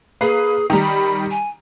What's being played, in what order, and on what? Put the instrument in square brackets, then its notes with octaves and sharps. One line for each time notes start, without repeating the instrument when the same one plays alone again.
[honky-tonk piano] A#3 B4 C7 [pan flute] G#4
[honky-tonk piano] D#3 G3 [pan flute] A#5
[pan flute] B5
G#5